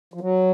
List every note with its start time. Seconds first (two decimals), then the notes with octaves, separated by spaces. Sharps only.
0.14 F3
0.21 F#3